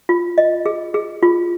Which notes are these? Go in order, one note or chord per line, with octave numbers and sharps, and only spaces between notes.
F4
D#5
G#4
G#4
F4